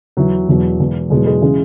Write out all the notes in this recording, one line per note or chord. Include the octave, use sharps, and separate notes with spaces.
E2 E3 F#3
E1 E2 B2 F#3
E1 E2 E3
E2 B2 F#3 G#3
G#3
C#3 E3 G#3